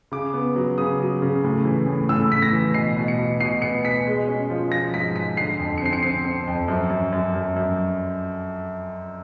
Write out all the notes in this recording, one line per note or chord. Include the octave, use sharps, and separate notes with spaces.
C#3 D6
B3
F#3
C#3 D#6
F#3
C#3
A2
E3
A2
A2 E6
A2 B6
A#6
E3
B2 C7
B2
C#7
B2
B2 C7
B3 C#7
B2 B6
G#3
C#4
F3
F3 A#6
G#2 B6
G#2 B6
D3 C7
F2
C#7
C4 C7
C#7
C4 C7
C4
F2
F#2
F#2
F#2
F#2
F#2